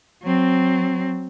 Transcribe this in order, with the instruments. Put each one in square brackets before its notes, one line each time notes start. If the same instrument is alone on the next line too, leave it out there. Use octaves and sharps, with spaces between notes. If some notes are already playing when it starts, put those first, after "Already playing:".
[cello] F#3 C4